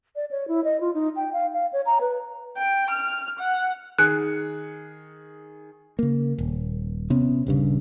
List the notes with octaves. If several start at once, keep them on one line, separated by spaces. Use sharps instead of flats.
D5
C#5
E4
D#5
F4
D#4
G5
F5
F5
C#5
A#5
B4
G5
F6
F#5
D#3 G#4 F#6 C#7
C#3 A#3
D#1
C3 B3 C#4
D#1 G2 C#3